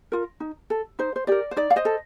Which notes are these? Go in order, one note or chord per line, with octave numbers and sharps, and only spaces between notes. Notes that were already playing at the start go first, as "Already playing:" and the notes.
F4 A#4
D#4
A4
D#4 C5
C5
G4 A#4 D5
C5
D#4 D5
F5
C5 D#5
A4